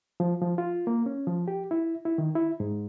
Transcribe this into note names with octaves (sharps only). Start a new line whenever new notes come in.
F3
F3
F4
A#3
C#4
F3
G4
E4
E4
D#3
E4
G#2